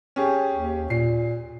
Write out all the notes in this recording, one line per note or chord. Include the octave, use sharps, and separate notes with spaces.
C#4 G4 G#4
D#2
A#2 C7